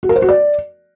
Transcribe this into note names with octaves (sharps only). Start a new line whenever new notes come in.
F#4
A#4
C5
F#4
D5